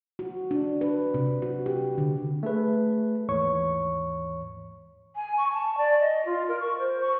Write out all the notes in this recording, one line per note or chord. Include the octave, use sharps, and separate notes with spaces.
F#4
D4
B4
C3
F#4
G4
D3
A3 G#4 B4
D#2 G#2 E3 C#5 C#6
G#5
C#6
A5
D5
D#5
F4
A#4
C#6
C5
C#6